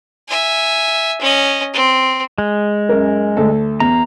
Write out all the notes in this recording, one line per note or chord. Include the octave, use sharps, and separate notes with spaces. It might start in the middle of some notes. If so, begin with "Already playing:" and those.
E5 G#5
C#4 D#5
C4
G#3
F#2 A#4
D2 A4
E2 A#5